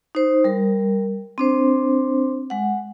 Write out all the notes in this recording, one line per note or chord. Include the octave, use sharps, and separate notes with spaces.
D#4 C5
G3 A#4
C4 D4 C5
G#3 F#5